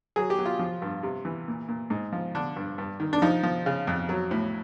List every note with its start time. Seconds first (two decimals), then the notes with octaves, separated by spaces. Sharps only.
0.16 F#3 G#4
0.30 G4
0.39 F#3
0.46 F4
0.59 F3
0.82 G2
1.03 C3
1.25 E3
1.48 A#2
1.68 A#2
1.90 G#2
2.13 F3
2.35 D3 D4
2.56 G2
2.78 G2
3.00 D#3
3.13 D4
3.22 F3 D#4
3.43 F3
3.66 C#3
3.87 F2
4.09 F#3
4.31 A2